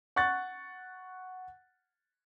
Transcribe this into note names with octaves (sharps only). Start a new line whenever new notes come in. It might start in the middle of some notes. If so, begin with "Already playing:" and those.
F#5 C#6 F#6 A6